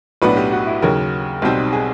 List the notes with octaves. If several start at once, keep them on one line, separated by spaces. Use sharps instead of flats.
B1 A2 F#3 B3 D4 B4
G4
F#4
E4
D#2 C#3 F#3 A#4
B1 B2 G3 C4 D#4
G#4